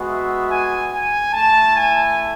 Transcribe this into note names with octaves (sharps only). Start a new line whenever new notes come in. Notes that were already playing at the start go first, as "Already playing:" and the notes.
Already playing: G#3 B3 F#4
E5
G#5
G#5
A3 E4 A5
G#5